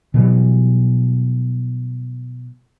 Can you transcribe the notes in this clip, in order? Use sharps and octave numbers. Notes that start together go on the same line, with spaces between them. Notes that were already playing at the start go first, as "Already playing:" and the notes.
B2 E3 F#3 G3